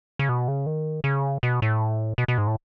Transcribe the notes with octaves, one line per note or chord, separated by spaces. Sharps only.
C#3
B2
C#3
D#3
C#3
B2
A2
B2
B2
G#2
A2